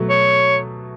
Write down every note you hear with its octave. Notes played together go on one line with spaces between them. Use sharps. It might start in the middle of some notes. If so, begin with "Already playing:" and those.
Already playing: B2 F#3 A3
C#5